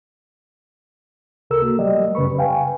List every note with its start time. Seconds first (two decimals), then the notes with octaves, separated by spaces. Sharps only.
1.50 C#2 C3 A4 A#4 E6
1.62 A#3 F#4
1.79 F#3 G3 A3 G4 D5 D#5
2.15 F#2 C#3 B4 B5 C#6
2.38 B4 F5 G5 G#5